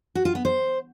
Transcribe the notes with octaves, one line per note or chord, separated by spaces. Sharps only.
F#4
F4
B3
C5